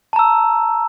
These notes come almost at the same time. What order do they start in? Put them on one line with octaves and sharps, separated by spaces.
A5 A#5 E6